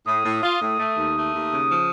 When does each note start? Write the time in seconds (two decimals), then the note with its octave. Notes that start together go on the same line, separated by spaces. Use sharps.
0.06 A2 D#6
0.24 A2
0.42 F4
0.61 A2
0.79 A3
0.96 D#2
1.15 A3
1.33 D#2
1.51 C#3
1.68 F3